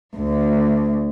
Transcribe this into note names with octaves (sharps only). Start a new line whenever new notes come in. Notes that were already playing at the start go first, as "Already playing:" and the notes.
D2